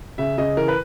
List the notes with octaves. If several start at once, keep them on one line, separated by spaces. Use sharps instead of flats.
C#3 E5
C#3 D#5
E3 A#4
B4